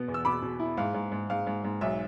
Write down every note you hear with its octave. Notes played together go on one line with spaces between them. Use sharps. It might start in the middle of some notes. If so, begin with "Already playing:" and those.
Already playing: B2 B3
E2
E6
B2 B5 D6
B2
E4
G#2 F5
G#2
G#2
G#2 F5
G#2
G#2
B1 E5